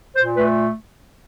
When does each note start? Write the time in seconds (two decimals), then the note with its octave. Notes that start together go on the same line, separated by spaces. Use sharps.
0.15 A#2 C5
0.37 A3 B4